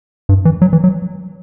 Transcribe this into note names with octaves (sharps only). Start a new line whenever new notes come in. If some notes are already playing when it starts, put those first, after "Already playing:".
G2
E3
F#3
E3
F#3